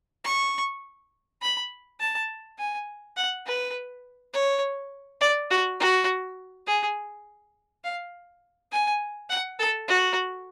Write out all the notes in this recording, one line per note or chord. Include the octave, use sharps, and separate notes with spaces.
C#6
B5
A5
G#5
F#5
B4
C#5
D5
F#4
F#4
G#4
F5
G#5
F#5
A4
F#4